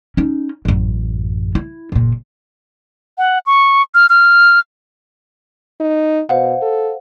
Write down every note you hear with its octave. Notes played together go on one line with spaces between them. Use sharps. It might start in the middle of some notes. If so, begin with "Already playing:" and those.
C#4 D#4
A1 F#2
E4
F#1 A#2
F#5
C#6
F6
F6
D#4
B2 C5 F5 F#5
A4